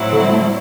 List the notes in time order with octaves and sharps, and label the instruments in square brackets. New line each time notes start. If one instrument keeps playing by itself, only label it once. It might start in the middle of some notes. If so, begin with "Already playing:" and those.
Already playing: [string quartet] A2 F#3 C4 E4
[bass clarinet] D3
G3
A3
G3